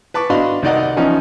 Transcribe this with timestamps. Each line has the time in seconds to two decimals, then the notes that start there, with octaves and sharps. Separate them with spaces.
0.14 B4 A5 C#6 D6
0.30 D4 F#4 D#5 F5 B5 C6
0.62 C2 D#4 D5 D#5 F#5
0.97 E3 F3 C#4 D#4